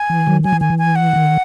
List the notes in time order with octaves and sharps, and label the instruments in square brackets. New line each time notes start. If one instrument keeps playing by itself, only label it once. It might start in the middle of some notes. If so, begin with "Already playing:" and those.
Already playing: [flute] G#5
[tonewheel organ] E3
D#3 F#3
[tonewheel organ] F#3 [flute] G#5
[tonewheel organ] E3
[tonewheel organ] D#3 [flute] G#5
[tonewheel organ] E3
[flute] G#5
F#5
[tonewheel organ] D#3